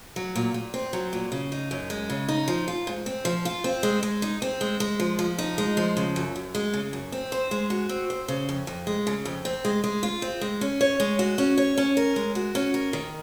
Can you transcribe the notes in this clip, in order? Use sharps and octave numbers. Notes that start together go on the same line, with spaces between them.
F#3
A#2
A#2
C4
F#3
A#2
C#3
D#4
F#2
G#3
C#3
D#4
F3
F4
G#2
C4
F3
F4
C4
G#3
G#3
D#4
C4
G#3
G#3
F3
F3
D#4
G#3
F3
C#3
F#2
F#2
G#3
C#3
F#2
C4
C5
G#3
F#4
C4
C5
C#3
F2
F2
G#3
C#3
F2
C4
G#3
G#3
F4
C4
G#3
C#4
C#5
G#3
F#4
C#4
C#5
C#4
A#4
G#3
F#4
C#4
A#4
D#3